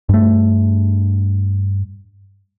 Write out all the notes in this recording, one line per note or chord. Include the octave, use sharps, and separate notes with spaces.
G2 A3